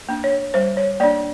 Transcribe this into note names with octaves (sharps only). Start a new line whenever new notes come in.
A#3 D4
C#5
G3 C5
C#5
A#3 D4 D5